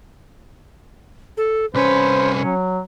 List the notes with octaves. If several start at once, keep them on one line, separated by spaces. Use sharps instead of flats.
A4
C2 C#4 B4 C5
F#3